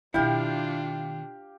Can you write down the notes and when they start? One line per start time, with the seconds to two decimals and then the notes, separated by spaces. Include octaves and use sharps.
0.14 B2 D#3 D4 E4 F4 G4 F5 G5